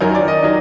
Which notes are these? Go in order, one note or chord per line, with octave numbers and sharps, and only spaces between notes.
F#2 D#3 F#3 A#4
D5
D#5
D#3 F#3